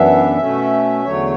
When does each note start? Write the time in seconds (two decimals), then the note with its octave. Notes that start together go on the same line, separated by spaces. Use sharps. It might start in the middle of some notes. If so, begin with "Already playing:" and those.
Already playing: F#2 E3 B3 D4 E5
0.38 B2 A3 C#4
1.04 E2 D3 F#3 A3 C#5